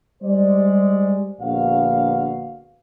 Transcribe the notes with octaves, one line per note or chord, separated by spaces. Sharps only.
G3 G#3 C5 D5
A#1 D3 B3 F#4 F5